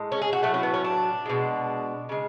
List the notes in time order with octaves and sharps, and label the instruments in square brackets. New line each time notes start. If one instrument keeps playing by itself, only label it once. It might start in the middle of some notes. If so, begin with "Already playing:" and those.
Already playing: [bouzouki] A2 G#3
C#4
G#4
F#4
A2 F#3 A3
C#4
B3
C#4
D4
B2 G#3
C#3 G#3